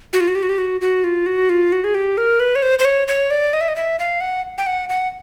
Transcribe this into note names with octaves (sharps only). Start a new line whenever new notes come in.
F#4
F4
F#4
G4
F#4
G4
F#4
F#4
F4
F#4
F4
F#4
G#4
G4
A#4
B4
C#5
C5
C5
C#5
C#5
D5
D#5
E5
D#5
E5
F5
F#5
G5
F#5
F#5